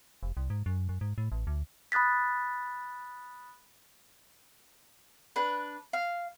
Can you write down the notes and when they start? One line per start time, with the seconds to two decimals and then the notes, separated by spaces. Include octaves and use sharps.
0.23 F1
0.37 C2
0.50 G#2
0.66 F#2
0.89 F#2
1.01 G#2
1.18 A2
1.32 A1
1.47 D2
1.92 B5 D#6 F#6 A6 B6
5.36 D4 B4
5.93 F5